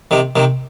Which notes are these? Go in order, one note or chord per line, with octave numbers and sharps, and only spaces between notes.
C3 D#3
C3 D#3